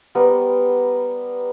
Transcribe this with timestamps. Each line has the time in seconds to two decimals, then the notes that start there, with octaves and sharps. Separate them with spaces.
0.15 G3 B3 A#4 C5